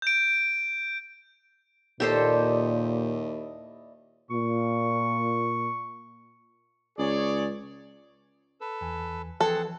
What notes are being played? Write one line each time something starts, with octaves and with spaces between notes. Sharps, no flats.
G6 D7
D#2 A#2 E4 G4 A4 C5 D5 D#5
A#2 C#6
C#2 G#4 C#5 D5
A4 B4
E2 E3 G#5
E3 F3 C4 G#4 A4 B4 F#5